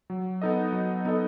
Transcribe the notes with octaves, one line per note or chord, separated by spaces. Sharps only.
F#3
B3 D#4 A4 D#5
F#3
B3 D#4 A4 D#5